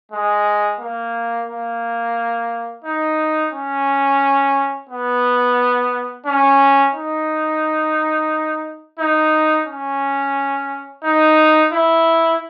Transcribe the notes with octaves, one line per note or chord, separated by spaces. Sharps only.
G#3
A#3
A#3
D#4
C#4
B3
C#4
D#4
D#4
C#4
D#4
E4